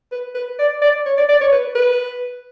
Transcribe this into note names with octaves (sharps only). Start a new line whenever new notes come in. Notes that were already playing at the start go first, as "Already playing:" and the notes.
B4
B4
D5
D5
C#5
D5
D5
C#5
B4
B4